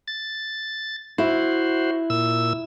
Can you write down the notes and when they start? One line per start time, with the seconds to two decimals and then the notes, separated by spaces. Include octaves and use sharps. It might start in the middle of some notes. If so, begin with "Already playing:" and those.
0.08 A6
1.18 E4 F#4 C5
2.10 A#2 E6